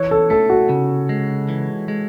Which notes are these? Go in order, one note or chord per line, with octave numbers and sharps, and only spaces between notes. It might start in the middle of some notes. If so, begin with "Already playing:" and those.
Already playing: E3 C#5
A4
A3 A4
F#4
C#3
G#3
E3
G#3